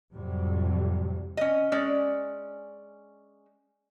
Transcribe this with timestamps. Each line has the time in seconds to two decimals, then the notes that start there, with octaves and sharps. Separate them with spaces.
0.13 F2 A2 C3 F#3 G3
1.37 C#4 D#5
1.72 G#3 C#4 D5